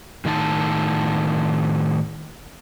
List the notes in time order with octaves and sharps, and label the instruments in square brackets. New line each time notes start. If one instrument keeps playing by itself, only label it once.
[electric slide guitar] A2 D#3 D4 D#4 A5